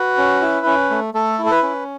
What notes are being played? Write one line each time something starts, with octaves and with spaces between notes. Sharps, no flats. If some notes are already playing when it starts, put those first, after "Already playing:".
Already playing: F#4 B4
C#4
E4
C#4
A3
A3 A4
E4
A4
B4
C#4